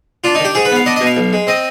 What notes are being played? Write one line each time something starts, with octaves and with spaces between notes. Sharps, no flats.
D4 F4
D#4
D#3
G4
G#2 G#4
B4
B3 F5
D4 D#5
D#5
B2
F5
B1
G#3
C4 D#5